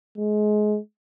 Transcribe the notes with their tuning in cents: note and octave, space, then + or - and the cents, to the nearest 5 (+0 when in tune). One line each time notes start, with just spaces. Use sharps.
G#3 +25